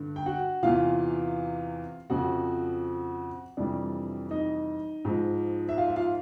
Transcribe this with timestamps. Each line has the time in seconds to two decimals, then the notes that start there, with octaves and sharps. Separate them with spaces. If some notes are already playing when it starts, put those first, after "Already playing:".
Already playing: G2 D3
0.16 G5
0.26 F#4 F#5
0.63 E2 C3 E3 F4 F5
2.10 F2 C#3 F3 F#4 F#5
3.57 F2 C3 E3 G3 D4 D5
4.31 D#4 D#5
5.05 G#2 F3
5.69 E5
5.78 F4 F5
5.88 E5
5.96 F4 F5